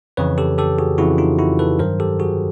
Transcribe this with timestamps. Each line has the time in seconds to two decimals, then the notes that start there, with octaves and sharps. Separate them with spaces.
0.17 F2 C#3 E3 B4 C#5
0.38 G4 A4
0.58 G4 A4
0.79 F#4 G#4
0.98 F2 C#3 E3 E4 F#4
1.18 D#4 F4
1.39 E4 F#4
1.59 A4 B4
1.79 G2 D#3 F#3 A#4 C5
2.00 G4 A4
2.20 F#4 G#4